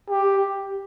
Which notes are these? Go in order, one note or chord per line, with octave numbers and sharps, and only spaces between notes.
G4